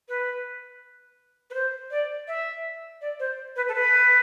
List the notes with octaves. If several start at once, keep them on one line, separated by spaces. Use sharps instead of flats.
B4
B4
C5
D5
E5
D5
C5
B4
A4
B4